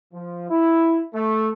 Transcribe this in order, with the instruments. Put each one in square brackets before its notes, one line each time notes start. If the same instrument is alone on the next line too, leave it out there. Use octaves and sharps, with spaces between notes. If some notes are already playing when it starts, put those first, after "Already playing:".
[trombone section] F3
E4
A3